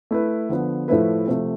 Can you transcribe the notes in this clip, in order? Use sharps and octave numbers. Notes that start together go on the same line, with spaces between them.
A3 E4 B4
D3 F3 B3
A2 F3 A3 E4 B4
C3 F3 A3